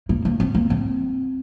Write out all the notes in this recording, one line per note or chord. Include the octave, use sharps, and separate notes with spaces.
A#3
A#3
C4
A#3
C4